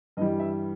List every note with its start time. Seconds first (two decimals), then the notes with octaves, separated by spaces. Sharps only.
0.17 G2 E3 G3 D#5
0.39 E5